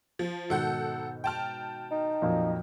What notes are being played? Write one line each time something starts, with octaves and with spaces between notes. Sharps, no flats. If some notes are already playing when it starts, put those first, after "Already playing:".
F3
G#2 B2 D#3 A4 F#5 G6
G5 A5 F6
D#4
F2 A#2 F#3